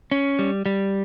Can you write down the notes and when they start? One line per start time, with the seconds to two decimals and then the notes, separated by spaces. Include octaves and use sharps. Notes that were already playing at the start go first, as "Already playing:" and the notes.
0.11 C#4
0.39 G3
0.66 G3